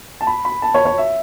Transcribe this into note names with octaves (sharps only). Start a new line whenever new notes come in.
A5
B5
B5
A5
C#5
C#5
E5